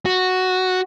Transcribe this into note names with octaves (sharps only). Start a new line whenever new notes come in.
F#4